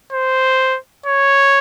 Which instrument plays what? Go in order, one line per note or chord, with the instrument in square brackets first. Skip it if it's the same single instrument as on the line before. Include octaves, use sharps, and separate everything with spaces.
[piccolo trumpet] C5
C#5